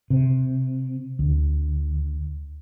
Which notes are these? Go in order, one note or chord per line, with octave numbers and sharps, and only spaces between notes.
C3
D2